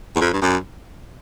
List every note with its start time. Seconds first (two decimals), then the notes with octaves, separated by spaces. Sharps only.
0.16 E2
0.21 F2
0.33 G2
0.42 F#2